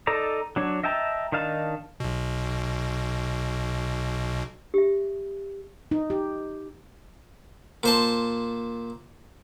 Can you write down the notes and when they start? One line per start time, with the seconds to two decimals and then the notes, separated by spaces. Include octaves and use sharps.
0.07 D#4 A4 D5 A#5
0.56 F#3 D4 C#5
0.83 D#5 E5 G5 A5 A#5
1.32 D#3 D4 D#4 F5 A5
2.00 B1 B2
4.74 G4 E5
5.91 D#4
6.10 G4
7.83 A#2 C5 A5